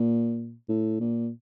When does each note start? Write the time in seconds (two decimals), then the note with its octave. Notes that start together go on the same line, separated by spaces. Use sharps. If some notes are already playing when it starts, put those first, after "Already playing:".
Already playing: A#2
0.69 A2
1.00 A#2